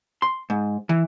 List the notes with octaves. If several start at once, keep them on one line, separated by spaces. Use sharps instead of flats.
C6
G#2
E3